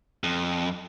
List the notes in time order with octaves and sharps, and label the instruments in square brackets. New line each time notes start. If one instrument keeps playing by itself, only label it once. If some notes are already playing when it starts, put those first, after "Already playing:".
[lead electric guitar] F2